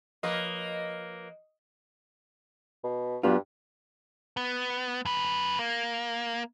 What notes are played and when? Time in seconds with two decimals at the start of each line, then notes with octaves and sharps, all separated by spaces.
0.23 F3 A#3 B4 D#5
2.84 B2
3.23 G2 F#3 B3 F4
4.37 B3
5.05 F#2 B4
5.59 A#3